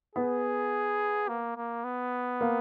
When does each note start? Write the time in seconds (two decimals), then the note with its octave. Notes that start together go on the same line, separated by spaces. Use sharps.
0.15 B3 G#4
1.28 A#3
1.57 A#3
1.84 B3
2.41 A#3